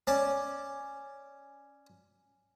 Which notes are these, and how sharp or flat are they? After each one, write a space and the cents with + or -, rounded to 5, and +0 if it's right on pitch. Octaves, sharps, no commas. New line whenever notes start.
C#4 +0 D5 +0 A5 +0